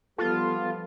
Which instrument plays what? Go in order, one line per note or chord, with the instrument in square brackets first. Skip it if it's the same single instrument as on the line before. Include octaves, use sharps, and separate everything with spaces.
[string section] F3 G3 B3 [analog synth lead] F4 [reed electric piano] A4